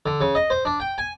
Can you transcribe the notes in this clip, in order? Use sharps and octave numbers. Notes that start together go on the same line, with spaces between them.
D3
C#3
D#5
C5
D4
G5
G#5